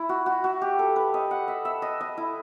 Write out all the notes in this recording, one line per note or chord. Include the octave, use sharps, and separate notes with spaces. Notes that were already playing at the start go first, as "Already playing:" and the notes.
Already playing: E4
F#4
F#4
F#4
G4
A4
B4
D#5
F#5
E5
E5
D#5
D#5
E4